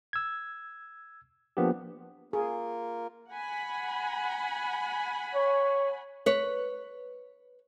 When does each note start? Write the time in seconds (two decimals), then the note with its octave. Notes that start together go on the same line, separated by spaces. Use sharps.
0.13 E6 G#6
1.57 F3 A#3 B3 D4 G4
2.33 A#3 F4 G#4 A#4
3.31 F#5 G#5 B5
5.35 C#5
6.26 B4 C#5